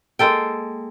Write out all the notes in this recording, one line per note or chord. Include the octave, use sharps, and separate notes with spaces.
G#3 A#3 A4 G5